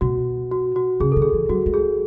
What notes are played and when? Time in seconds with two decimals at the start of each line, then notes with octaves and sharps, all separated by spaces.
0.01 B2 F#4
0.52 F#4
0.76 F#4
1.00 C#3 G#4
1.12 D3 A4
1.22 G#4
1.33 E3
1.49 F#3 F#4
1.66 G#3
1.74 G#4